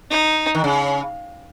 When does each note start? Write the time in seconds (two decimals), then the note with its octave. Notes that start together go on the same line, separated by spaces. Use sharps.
0.11 D#4
0.55 D#3
0.64 C#3